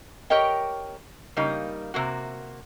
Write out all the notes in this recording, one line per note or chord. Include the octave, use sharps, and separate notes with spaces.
G4 A#4 C#5 D#5 G5
C#3 G3 A#3 D#4
C3 A#3 F#4